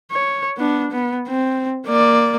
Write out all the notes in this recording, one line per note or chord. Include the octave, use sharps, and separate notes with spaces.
C#5
B3 D4
B3
C4
A#3 D5